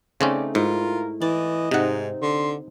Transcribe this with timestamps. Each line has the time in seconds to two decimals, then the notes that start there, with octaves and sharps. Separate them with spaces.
0.21 C#3 A3 C4 C#4 D#4 D5
0.55 G#2 E4 F4 A#4
1.21 E3 D5 D#5
1.71 G#2 C3 C4 D#4 F#5
2.22 D3 C6